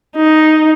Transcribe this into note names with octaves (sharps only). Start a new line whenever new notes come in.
D#4